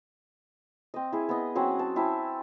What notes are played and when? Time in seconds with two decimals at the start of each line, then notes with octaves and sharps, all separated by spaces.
0.94 C4 D#5
1.13 E4 G#4
1.29 B3 D#5
1.55 F#3 C4 C#4 F#5
1.79 A5
1.96 C4 E4 G#5 A5